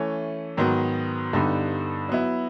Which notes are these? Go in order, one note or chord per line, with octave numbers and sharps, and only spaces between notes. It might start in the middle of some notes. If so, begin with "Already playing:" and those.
Already playing: E3 A3 C#4
G#2 D#3 F#3 B3
G2 D3 G3 B3 D#4
F#3 B3 E4